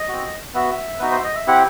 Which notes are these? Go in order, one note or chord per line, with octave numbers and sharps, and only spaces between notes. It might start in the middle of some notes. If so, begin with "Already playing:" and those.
Already playing: D#5
C4 F#4
B3 F#4 E5
B3 D#4 F#4 B4
C5
D#5
E5
C4 E4 G4 F#5